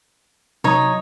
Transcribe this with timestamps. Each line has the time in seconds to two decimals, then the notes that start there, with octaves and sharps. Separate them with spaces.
0.64 C3 F#3 D#4 C#5 D#6